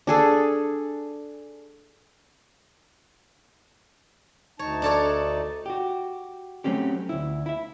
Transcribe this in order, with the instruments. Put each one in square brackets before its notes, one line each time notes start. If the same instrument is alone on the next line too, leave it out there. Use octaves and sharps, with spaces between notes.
[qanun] D4 G#4 A4
[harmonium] D2 D#4 A5 [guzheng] C#5
[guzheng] D4 A4 C#5
[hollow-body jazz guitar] F#4 G4
F#3 A3 C4 C#4 G4
D2 E4
E4 E5